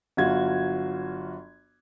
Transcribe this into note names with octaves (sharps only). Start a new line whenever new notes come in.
G1 F#3 F4 F#4 G#6